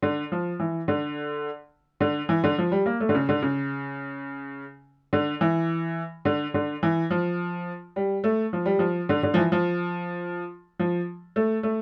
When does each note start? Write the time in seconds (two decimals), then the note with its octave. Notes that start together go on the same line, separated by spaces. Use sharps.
0.02 D3
0.32 F3
0.60 E3
0.88 D3
2.01 D3
2.29 E3
2.44 D3
2.58 F3
2.72 G3
2.86 A#3
3.00 A3
3.09 D3
3.15 C#3
3.29 D3
3.42 C#3
5.13 D3
5.41 E3
6.25 D3
6.54 D3
6.83 E3
7.10 F3
7.96 G3
8.24 A3
8.53 F3
8.66 G3
8.79 F3
9.09 D3
9.23 D3
9.34 F3
9.37 E3
9.52 F3
10.79 F3
11.36 A3
11.63 A3